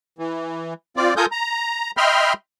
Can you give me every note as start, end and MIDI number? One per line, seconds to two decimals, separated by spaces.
0.19 0.74 52
0.97 1.14 60
0.97 1.14 65
0.97 1.14 74
1.17 1.26 65
1.17 1.26 69
1.17 1.26 70
1.17 1.26 80
1.17 1.26 87
1.17 1.26 91
1.32 1.91 82
1.97 2.33 75
1.97 2.33 76
1.97 2.33 79
1.97 2.33 83
1.97 2.33 84
1.97 2.33 89